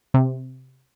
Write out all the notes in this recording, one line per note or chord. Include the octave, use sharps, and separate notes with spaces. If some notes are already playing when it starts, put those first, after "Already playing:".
C3